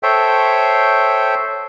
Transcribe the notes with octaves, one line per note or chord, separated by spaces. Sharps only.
A4 C5 C#5 E5 G5